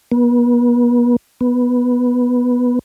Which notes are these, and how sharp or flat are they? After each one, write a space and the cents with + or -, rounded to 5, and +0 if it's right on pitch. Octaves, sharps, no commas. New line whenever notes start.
B3 -40
B3 -5